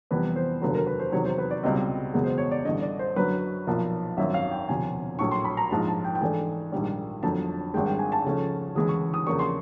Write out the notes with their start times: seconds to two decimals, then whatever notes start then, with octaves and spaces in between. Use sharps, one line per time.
0.11 F2 C3 E3 G3 B3 B4
0.36 C5
0.62 F1 D#2 D3 F#3 A3 B4
0.75 A#4
0.87 B4
1.00 C5
1.12 E2 C3 D#3 F#3 C#5
1.25 C5
1.38 B4
1.51 D5
1.63 C#2 B2 G3 C4 D#5
2.14 F#1 E2 B2 G#3 B3
2.24 C5
2.38 C#5
2.51 D5
2.65 A1 G2 D3 D#5
2.82 D5
2.99 C5
3.16 F#2 D3 F#3 B4
3.67 B1 A#2 F3 A#3
4.17 G#1 F#2 D#3 E5
4.34 F5
4.51 G5
4.69 E1 D2 C3 F3 G#5
5.19 A#1 A2 F#3 C#6
5.31 C6
5.44 B5
5.57 A#5
5.71 A#1 G#2 F3 A5
5.87 A5
6.04 G5
6.15 G5
6.21 G#2 E3 A3 D4 G#5
6.72 A#1 G#2 D#3 G3
7.23 G1 F2 D3 F#3 A3 A5
7.74 G#1 G2 D#3 G#3 G5
7.87 G5
7.99 G#5
8.12 A5
8.25 C#2 C#3 F3 A3 C#4
8.75 D2 C#3 E3 G#3 D#6
8.88 C#6
9.14 D#6
9.27 E2 C#3 F3 A#3 D4 C#6
9.39 C6